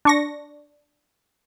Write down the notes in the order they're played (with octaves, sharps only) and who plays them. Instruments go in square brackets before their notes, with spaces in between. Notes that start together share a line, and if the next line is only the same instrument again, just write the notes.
[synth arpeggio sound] D4 C#6 A#6